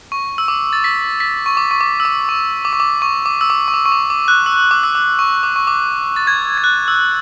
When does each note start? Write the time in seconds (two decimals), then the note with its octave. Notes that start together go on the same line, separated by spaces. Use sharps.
0.12 C#6
0.38 E6
0.48 D6
0.73 A6
0.84 B6
1.20 B6
1.46 C#6
1.57 D6
1.71 C#6
1.81 D6
2.00 E6
2.05 D6
2.29 C#6
2.65 D6
2.73 C#6
2.80 D6
3.02 C#6
3.26 D6
3.41 E6
3.50 D6
3.68 C#6
3.74 D6
3.85 C#6
3.92 D6
4.10 D6
4.28 F#6
4.46 E6
4.71 D6
4.83 E6
4.95 D6
5.19 C#6
5.43 D6
5.56 C#6
5.67 D6
6.16 A6
6.27 G#6
6.58 G#6
6.64 F#6
6.88 E6